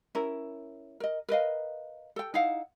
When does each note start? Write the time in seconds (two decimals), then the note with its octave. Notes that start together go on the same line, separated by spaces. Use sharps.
0.15 C#4 E4 A#4
1.00 A#4 D#5
1.29 A#4 B4 D#5 F5
2.16 A4 G5
2.34 D#4 E4 F5 F#5